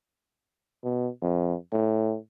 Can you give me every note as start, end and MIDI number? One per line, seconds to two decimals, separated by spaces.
0.84 1.08 47
1.22 1.54 41
1.72 2.16 45